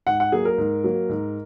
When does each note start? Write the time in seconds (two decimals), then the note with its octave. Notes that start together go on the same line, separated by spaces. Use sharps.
0.06 G#2 F#5
0.20 F#5
0.32 F#3 A#3 G#4
0.45 A#4
0.58 G#2
0.84 F#3 A#3
1.09 G#2